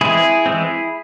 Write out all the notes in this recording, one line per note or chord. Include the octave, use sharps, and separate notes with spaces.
E3 G#3 C4 E4 G#4
E3 G#3 C4